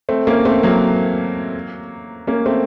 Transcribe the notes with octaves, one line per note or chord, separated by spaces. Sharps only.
A3 C4
A#3 C#4
A3 C4
F#3 A#3
A#3 C#4
A3 C4